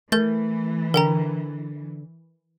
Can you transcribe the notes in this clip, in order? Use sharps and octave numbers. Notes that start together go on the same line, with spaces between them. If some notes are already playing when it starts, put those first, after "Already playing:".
E3 A3 A#4 G6 A6
D3 A#4 G5 A#5